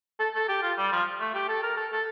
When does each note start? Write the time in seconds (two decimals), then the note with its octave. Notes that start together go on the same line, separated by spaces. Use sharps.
0.20 A4
0.35 A4
0.49 G4
0.63 F4
0.78 G3
0.92 F3
1.20 A3
1.35 G4
1.49 A4
1.63 A#4
1.77 A4
1.92 A4